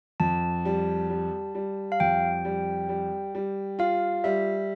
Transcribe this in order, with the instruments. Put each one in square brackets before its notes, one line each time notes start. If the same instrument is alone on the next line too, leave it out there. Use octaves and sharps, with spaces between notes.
[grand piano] F2 [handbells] A5
[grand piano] G3
G3
G3
[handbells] F5
[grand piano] F2 [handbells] G5
[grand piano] G3
G3
G3
[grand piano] F4 [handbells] F5
[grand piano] G3 [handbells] E5